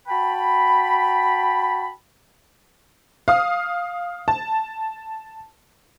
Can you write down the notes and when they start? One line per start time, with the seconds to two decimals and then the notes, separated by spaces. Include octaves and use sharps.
0.08 F#4 G5 A5 B5
3.28 F5 D#6
4.28 A5